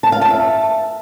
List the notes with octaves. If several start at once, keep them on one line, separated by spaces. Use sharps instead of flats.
A5
F5
A5
E5